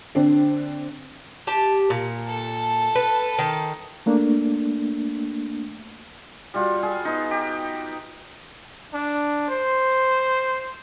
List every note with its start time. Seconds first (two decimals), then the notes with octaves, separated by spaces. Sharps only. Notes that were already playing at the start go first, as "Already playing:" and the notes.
0.15 D3 C4 D4
1.47 G4 A5
1.90 A#2
2.26 A4 A5
2.95 B4
3.39 D#3
4.06 A3 A#3 D4
6.54 G3 F4 F#4
6.83 G#4
7.05 B3 D#4
7.31 G4
8.93 D4
9.49 C5